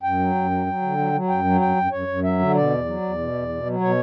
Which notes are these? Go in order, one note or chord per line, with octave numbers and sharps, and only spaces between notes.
F#2 G5
F#3
F#2
F#3
F#3
D3
F#3
F#3
F#2 G5
F#3
F#2 G5
F#2
F#2 C#5
F#2
F#3 E5
D3
B2 D5
E2
F#3
E2
B2
E2
B2
F#3
B2 C#5